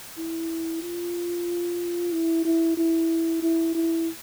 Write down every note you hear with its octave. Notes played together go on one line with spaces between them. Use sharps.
E4
F4
E4
E4
E4
E4
E4